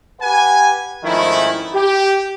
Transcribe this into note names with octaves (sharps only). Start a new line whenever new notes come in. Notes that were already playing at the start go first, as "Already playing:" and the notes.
G4 B4 F#5 G#5
G#2 D#3 F3 A3 C#4 E4
G4